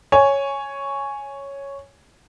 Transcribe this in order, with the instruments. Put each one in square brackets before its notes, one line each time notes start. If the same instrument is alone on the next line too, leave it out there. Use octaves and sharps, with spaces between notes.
[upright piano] C#5 G#5